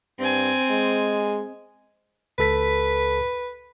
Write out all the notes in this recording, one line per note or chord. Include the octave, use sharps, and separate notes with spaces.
G2 C4 G#5
G#3
C#2 A4 B4 B6